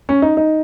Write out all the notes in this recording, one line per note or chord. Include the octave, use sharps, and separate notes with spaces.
C#4
D#4
D#4